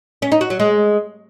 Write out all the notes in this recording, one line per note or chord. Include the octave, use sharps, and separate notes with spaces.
C#4
D#4
F#4
F#3
G#3